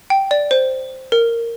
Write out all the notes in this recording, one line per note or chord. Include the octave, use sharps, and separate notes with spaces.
G5
D5
C5
A#4